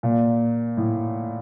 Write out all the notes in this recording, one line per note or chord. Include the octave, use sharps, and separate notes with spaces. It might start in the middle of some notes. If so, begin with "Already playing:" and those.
A#2
A2